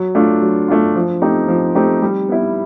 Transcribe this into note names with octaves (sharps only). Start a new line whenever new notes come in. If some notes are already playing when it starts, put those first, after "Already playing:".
Already playing: F#3
A3 D4 F4
F#3
A3 D4 F4
F3
A3 C4 D#4 G4
F3
A3 C4 D#4 G4
G3
B3 E4